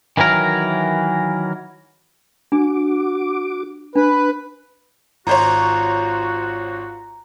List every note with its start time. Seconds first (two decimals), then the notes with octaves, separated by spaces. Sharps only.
0.17 D#3 E3 F#3 A#4
2.52 D4 F#4 D6
3.96 D4 B4
5.27 G#1 F4 F#4 C5 C#5 A#5